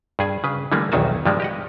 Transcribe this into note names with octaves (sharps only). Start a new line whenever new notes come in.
G2 G#4 G#5
C#3 B4
D3 E3 G3 A3 A#3
B1 E2 D#3 F#4 G#5 A5
G2 F3 G3 G#3
G4 D#5 F#5